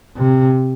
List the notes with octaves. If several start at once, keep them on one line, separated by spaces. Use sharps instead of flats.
C3